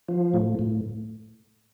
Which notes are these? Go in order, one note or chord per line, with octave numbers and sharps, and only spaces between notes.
F3
A2
A2